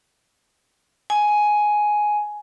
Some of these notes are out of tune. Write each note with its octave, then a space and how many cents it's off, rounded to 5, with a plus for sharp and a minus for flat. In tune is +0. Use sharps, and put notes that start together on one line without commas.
G#5 +10